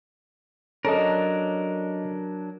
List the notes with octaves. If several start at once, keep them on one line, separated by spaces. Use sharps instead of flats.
F#3 C#4 D4 A4 A#4 D#5